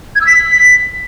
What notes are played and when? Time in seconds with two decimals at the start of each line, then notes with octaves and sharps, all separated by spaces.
0.15 G#6
0.21 E6
0.26 B6